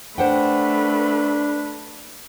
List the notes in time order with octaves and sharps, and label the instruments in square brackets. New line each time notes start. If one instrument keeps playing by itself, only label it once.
[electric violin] A3 B4 [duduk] D4 [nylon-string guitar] C5 F#5 G5